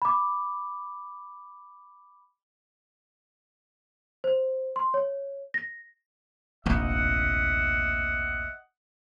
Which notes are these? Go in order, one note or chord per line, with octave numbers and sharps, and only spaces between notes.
B5 D6
C5
C6
C#5
A#6
F1 A#1 D#2 D#5 E5 F#5